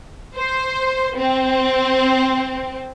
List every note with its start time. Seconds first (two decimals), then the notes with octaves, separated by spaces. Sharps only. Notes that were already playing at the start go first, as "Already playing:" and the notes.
0.36 C5
1.17 C4